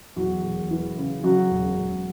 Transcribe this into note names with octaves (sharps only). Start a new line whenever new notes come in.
E2 F#3 F#4
E1
E3
C#3
C#3 F#3 F#4
E1
E1